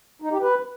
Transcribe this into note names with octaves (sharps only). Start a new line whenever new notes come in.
D#4
G4
B4